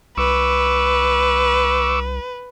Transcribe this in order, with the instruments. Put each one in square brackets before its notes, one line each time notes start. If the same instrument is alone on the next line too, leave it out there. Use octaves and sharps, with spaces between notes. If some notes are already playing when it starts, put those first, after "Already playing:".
[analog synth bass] C2 [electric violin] B4 [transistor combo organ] C#6 D6 E6